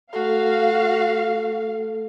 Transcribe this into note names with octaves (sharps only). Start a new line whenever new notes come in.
A3 F#4 A4 F5